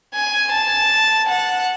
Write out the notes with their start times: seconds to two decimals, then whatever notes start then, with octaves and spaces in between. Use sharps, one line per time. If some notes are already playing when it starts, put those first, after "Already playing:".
0.14 G#5
0.52 A5
1.28 F#5